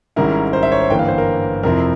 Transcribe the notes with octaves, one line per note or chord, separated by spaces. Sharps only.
G#1 G#2 G3 C#4 E4 A#4
C5
E5
C#5
C5
G1 G2 E3 A#3 G5
F5
C5
A#4
F2 C3 F3 C4 E4 A#4